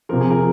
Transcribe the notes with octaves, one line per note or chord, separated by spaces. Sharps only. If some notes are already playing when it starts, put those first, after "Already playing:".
C3 F3 A#4
G#4
A#4